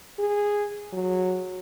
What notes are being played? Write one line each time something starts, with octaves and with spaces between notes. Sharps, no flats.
G#4
F#3